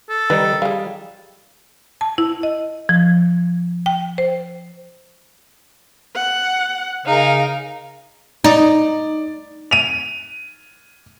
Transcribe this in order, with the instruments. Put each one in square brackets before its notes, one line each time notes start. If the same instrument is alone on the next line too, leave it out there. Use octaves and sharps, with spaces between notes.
[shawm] A4
[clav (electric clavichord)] D#3 G3 D#4 [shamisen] B4
[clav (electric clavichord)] G3 [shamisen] G#4 F5
[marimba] A5
E4
D#5
F3
G5
C5
[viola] F#5
[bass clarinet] C#3 [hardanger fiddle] D#4 A#4 [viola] F5
[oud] D#4 [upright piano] D5
[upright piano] D#7 F7